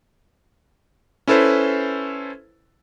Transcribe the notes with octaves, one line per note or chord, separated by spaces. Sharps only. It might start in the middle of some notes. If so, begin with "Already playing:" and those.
C#4 E4 A4 B4 C5